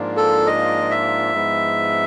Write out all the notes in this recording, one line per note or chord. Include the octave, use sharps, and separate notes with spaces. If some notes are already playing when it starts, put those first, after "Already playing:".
Already playing: G#2 F3 A#3 D4 F4
A4
D#5
E5
G#2 F3 G#3 B3 E4